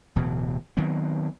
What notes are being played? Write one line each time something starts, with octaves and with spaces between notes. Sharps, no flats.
D1 B2 E3
D#3 F#3 B3 C4